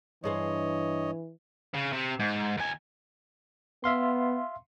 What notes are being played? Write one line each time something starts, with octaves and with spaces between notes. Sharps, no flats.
G2 E3 G#4 C5 C#5 D#5
C#3
C3
G#2
D#2 G#5
B3 E5 F5 C6